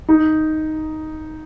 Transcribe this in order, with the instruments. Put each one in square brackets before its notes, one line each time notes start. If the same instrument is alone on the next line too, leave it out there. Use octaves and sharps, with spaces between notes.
[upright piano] D#4